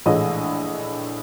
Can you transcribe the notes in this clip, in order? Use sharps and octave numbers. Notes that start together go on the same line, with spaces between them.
A#1 A2 E3 G#3 D#5